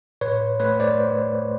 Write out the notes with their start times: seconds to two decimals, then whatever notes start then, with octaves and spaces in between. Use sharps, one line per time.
0.21 A2 B4 C#5
0.60 A3 B4 C#5
0.80 C5 D5